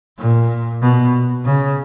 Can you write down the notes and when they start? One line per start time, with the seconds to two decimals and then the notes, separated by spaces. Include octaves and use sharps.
0.19 A#2
0.82 B2
1.45 C#3